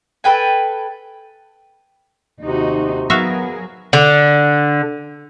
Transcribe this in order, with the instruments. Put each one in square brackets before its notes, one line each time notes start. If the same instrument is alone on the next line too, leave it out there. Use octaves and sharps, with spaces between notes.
[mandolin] A4 B4 G5 G#5
[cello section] D#2 D#4 F#4 [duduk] C3
[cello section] F#3 G#4 A#4 [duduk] B3 [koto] F#4 E5 F5
[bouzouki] D3